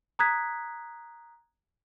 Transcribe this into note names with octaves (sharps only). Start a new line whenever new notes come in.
A#5 D#6 F#6 G#6 B6